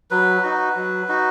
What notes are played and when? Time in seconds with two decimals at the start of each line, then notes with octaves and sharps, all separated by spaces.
0.11 F#3 B4
0.43 D#4 F#4
0.76 F#3
1.08 D#4 F#4